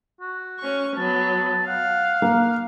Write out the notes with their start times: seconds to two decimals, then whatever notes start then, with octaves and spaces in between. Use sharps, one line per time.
0.21 F#4
0.60 C#4 C#6
0.97 F#3 B3 A5
1.67 F5 F#5
2.22 A#3